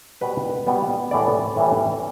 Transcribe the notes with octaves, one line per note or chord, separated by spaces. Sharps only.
B2 G3 B3 B4
B2 G3 B3
A2 E3 G3 D5
A2 E3 G3